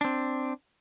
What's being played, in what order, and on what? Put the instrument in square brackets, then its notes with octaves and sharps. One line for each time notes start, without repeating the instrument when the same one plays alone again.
[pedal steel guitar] C4 D4